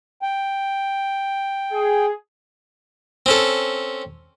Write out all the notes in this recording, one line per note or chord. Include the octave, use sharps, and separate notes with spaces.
G5
G#4
C4 C#4 A4